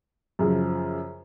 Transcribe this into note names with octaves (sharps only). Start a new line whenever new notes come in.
F#2 C#3 F3